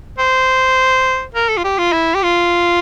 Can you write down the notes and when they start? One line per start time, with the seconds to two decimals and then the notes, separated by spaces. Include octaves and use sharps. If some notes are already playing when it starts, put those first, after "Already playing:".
0.18 C5
1.35 A#4
1.49 A4
1.57 F4
1.64 G4
1.78 F4
1.92 E4
2.15 G4
2.23 F4